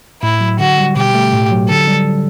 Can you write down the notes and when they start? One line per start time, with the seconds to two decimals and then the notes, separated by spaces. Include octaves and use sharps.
0.22 A2 E4
0.41 F#3
0.59 D3 F#4
0.78 G3
0.96 B2 G4
1.14 A3
1.33 A2
1.51 F#3
1.69 D3 A4
1.88 G3